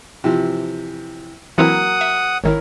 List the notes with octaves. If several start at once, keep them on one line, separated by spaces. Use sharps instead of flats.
C3 E3 F3
E3 F#3 A#3 C4 E4 F#5 D#6
E5
G#1 D#3 E4 A#4 C#5